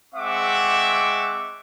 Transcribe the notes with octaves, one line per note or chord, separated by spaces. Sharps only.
G#3 C4 E5 F#5 C#6 D6